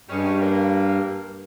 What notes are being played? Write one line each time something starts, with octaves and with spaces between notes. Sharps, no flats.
G2 G3 G#3 C#4
A#3